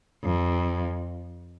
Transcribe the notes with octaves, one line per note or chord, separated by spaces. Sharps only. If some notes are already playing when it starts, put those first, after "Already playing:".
F2